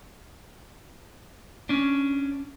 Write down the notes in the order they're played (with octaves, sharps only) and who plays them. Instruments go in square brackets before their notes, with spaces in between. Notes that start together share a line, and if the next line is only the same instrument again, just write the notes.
[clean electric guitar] C#4 D4